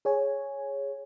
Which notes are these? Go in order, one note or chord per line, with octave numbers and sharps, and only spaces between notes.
G#4 C#5 G#5